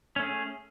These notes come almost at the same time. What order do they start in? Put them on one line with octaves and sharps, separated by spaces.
C#4 A3 G#4